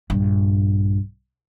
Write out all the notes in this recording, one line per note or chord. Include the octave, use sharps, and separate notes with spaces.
A#1 G2